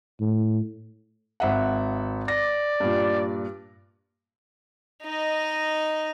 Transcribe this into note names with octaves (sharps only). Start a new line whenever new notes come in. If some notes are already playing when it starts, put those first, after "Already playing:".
A2
G#1 E5 F#5
D5 A#6
G2 A#2
D#4 D#5